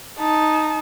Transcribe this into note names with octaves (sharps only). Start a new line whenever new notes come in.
D#4 A5